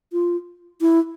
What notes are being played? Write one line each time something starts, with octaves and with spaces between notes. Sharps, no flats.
F4
E4